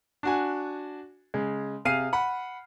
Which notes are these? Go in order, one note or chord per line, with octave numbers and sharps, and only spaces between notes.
D4 F#4 G#5
C#3 G#3
C3 G#4 F5 F6 C7 D#7
F#5 B5